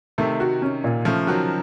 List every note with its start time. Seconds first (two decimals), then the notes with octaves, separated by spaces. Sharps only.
0.18 C3 D#3 A3
0.40 F#4
0.62 C#4
0.84 A#2
1.05 C#3 F3 A3
1.27 D#3 F#3 F#4